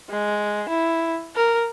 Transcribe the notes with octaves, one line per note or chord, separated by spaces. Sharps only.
G#3
E4
A#4